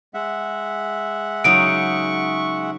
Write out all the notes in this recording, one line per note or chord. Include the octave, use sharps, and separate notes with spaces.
G#3 E5 F#5
C#3 F#3 D#4 C#6 D7